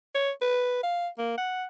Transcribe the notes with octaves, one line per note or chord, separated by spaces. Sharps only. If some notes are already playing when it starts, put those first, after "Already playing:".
C#5
B4
F5
A#3
F#5